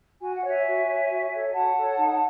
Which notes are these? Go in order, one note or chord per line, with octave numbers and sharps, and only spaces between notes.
F#4 G#5
F#5
C#5 E5 G#5
F#4
C#5
F#4
A4 C#5
F#4 F#5 A5
A4 C#5
D#4